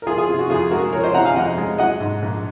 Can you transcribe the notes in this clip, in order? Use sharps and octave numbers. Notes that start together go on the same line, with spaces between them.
A#4
F3 F4 G#4
F4 G#4
C3 F4
F#4
F2 F4 G#4
G#3 F#4 A#4
F3 A#4 C#5
C5 D#5
C3 F#5 A#5
F5 G#5
F2 D#5 F#5
G#3
F#3 D#5 F#5
G#2
A#1